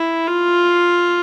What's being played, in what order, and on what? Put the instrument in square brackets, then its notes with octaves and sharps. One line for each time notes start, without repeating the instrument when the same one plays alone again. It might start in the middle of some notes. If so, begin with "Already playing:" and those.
Already playing: [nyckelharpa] E4
F4